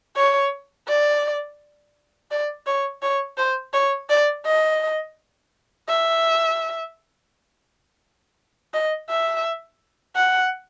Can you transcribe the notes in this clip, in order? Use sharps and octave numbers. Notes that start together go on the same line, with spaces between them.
C#5
D5
D5
C#5
C#5
C5
C#5
D5
D#5
E5
D#5
E5
F#5